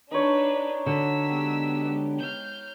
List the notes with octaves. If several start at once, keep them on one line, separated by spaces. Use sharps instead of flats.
D4 D#4 B4 C#5
D3 F#4 E6 B6
G#3 B3 G4
F6 G6